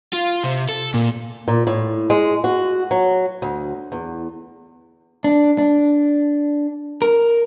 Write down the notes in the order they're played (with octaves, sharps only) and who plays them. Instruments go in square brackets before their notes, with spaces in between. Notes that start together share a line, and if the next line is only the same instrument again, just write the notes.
[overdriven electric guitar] F4
C3
A4
A#2
[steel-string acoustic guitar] A#2
A2
G#3
F#4
F#3
D2
E2
[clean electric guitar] D4
D4
A#4